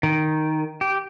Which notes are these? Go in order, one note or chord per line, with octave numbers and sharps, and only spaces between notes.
D#3
G4